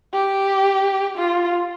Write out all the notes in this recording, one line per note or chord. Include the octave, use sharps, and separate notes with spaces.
G4
F4